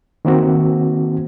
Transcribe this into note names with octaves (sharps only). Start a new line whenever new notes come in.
D#3 A#3 C4 F#4